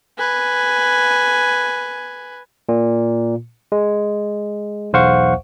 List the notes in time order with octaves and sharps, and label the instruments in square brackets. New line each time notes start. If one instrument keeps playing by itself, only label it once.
[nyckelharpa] B4 G#5
[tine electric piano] A#2
G#3
B1 E2 C5 F5 F#5 C#6